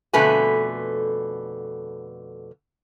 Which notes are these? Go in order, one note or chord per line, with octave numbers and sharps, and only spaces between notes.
F2 B2 D3 A3 B4 G#5